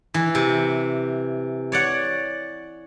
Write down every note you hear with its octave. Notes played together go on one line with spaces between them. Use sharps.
E3
C3
C#5 D5 F#5